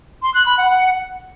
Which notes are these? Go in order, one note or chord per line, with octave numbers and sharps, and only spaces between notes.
C6
F#6
B5
F#5